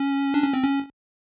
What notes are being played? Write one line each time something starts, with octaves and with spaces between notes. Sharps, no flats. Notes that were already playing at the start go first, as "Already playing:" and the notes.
Already playing: C#4
D4
C#4
C4
C#4